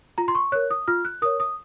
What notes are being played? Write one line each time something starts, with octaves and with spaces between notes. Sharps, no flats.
F4 A#5
C6
C#6
A#4 C#5 F#6
D#6
F4 F6
F#6
A#4 C#5 D#6
D#6